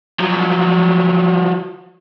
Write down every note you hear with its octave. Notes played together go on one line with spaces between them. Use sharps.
F3 F#3